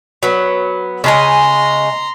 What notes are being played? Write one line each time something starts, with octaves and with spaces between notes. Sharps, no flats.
F#3 B3
C#3 G#3 G#5 A#5 C6